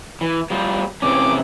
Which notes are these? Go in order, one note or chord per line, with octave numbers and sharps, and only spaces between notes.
E3
F#3 G3 F4
C3 E3 C#4 D6